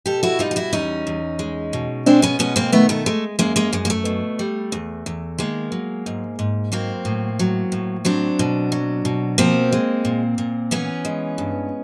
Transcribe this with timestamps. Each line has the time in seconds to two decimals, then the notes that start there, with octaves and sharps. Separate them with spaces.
0.06 B2 G4 A4
0.23 E4 F#4
0.39 G3 D#4 F4
0.51 F4
0.56 E4 F#4
0.73 E2 C#4 D#4
1.07 E2
1.39 G#3
1.73 B2
2.06 G#3 C4 D4
2.22 B3 C#4
2.39 B2 B3 C#4
2.56 A#3 C4
2.72 D#3 A3 B3
2.89 A3 B3
3.06 G#3 A3
3.39 F#2 G#3 A#3
3.56 G#3 A#3
3.73 F#2 G#3
3.85 A#3
3.90 A3
4.05 B2
4.39 G3
4.72 E2
5.06 E2
5.38 D#3 G#3 A#3
5.72 F#3
6.06 G#2
6.39 G#2
6.72 F#3 A#3 C4
7.05 A2
7.39 F#3
7.72 A2
8.05 F#3 C4 D4
8.39 B2
8.72 F#3
9.05 B2
9.38 F3 A#3 C4
9.72 G#3
10.05 A#2
10.38 A#2
10.71 E3 B3 C#4
11.05 G#3
11.38 G2